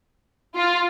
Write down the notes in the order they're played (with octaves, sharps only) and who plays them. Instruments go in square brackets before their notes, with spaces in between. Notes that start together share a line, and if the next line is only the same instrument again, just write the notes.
[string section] F4